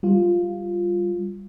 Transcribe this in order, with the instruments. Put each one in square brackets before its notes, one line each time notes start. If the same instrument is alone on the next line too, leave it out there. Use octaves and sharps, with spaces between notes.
[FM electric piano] G3 F4